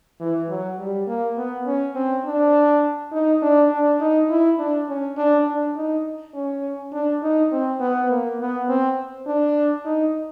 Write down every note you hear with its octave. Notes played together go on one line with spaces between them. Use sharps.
E3
F#3
G3
A#3
B3
C#4
C4
D4
D#4
D4
D4
D#4
E4
D4
C#4
D4
D4
D#4
C#4
D4
D#4
C4
B3
A#3
B3
C4
D4
D#4